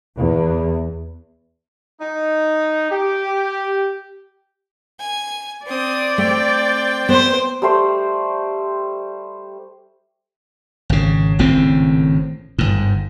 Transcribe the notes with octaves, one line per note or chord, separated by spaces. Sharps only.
E2
D#4
G4
G#5
C4 D5 D#6
A3 C4 G5
B3 C5
G3 A3 C5 C6
G#1 C#3
G#1 A2 C#3 C4
G1 G#2